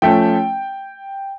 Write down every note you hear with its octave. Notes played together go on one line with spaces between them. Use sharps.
F3 A3 C#4 G5